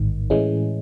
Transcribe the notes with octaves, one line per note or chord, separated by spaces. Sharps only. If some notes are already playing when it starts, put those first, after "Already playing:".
Already playing: A1 G#2 D#3
A2 E3 G#3 C#4